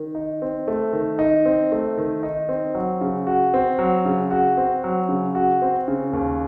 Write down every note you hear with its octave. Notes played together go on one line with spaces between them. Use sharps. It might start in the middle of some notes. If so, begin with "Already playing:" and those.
Already playing: D#3
D#4
C4
A3
D#3
D#4
C4
A3
D#3
D#4
C4
F#3
C#3
F#4
C4
F#3
C#3
F#4
C4
F#3
C#3
F#4
C4
C#3
D#2